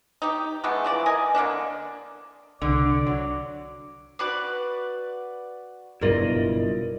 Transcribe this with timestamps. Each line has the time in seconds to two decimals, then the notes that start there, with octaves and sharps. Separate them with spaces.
0.22 D#4 G4
0.64 G#3 A3 B3 D4
0.84 E3 F3 D5
1.06 A#4 D#5 G#5
1.35 D3 A#3 C#4 D4
2.61 C2 D3 D5
3.07 F#3
4.19 F#4 B4 D5
6.01 F#1 G2 B2 E4 F4 A#4 D5 D#5